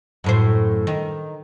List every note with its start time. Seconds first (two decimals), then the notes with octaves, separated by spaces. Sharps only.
0.24 F#2 A2 C5
0.87 D#3